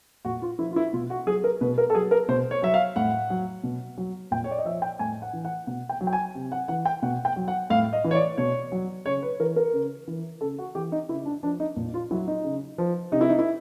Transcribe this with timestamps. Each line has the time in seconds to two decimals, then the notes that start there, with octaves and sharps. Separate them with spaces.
0.25 A#2 F#4
0.42 F4
0.59 F3 E4
0.72 F4
0.76 E4
0.93 B2 F4
1.10 F#4
1.26 F#3 G#4
1.44 A#4
1.61 B2 B4
1.78 A#4
1.90 A4
1.95 F#3 G#4
2.11 A#4
2.28 B2 C5
2.51 C#5
2.62 F#3 E5
2.74 F5
2.96 A2 F#5
3.30 F#3
3.63 B2
3.98 F#3
4.31 A#2 G5
4.44 C#5
4.51 D5
4.58 D#5
4.65 F3 E5
4.82 G5
4.99 A2 G#5
5.22 F#5
5.33 E3
5.45 F#5
5.67 B2 F#5
5.89 G5
6.01 F#3
6.07 G5
6.13 G#5
6.35 C3
6.52 F#5
6.68 E3 F#5
6.85 G5
7.02 B2 F#5
7.25 G5
7.36 F#3
7.48 F#5
7.70 A2 F5
7.93 D#5
8.04 E3
8.11 C#5
8.15 D5
8.38 B2 C#5
8.72 F#3
9.06 C#3 C#5
9.22 B4
9.40 E3 A#4
9.56 A#4
9.73 C#3
10.08 E3
10.41 C#3 A4
10.58 F#4
10.75 E3 G4
10.92 D#4
11.09 C#3 E4
11.26 D4
11.43 F3 D4
11.60 D#4
11.76 A#2
11.94 F4
12.11 F#3 E4
12.28 D#4
12.44 C#3
12.78 F3
13.12 C3 D#4
13.21 E4
13.29 D#4
13.39 E4